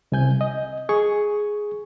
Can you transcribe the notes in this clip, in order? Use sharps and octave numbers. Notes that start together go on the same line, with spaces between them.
C2 C3 G#5 G6
D#5
G#4 C#6